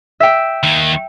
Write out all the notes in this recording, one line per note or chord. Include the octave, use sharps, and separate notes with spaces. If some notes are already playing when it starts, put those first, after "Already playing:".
E5 G5
D#2 D#3